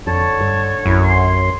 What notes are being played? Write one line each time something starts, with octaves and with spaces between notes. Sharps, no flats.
F2 D3 C#5 A5
G2
A#1 F#2 E4
C6